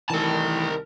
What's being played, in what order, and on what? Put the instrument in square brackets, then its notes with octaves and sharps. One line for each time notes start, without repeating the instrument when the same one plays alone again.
[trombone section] C2 D#3 [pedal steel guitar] E3 A3 [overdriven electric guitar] A#4 A5